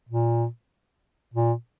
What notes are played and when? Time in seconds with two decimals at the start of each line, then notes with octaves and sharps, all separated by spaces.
0.09 A#2
1.34 A#2